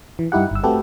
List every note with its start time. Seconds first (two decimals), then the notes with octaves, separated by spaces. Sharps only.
0.19 E3
0.32 G2 D#4 E4 G4 F#5
0.51 G1 E6
0.63 A3 C4 F#4 G4 A4 B4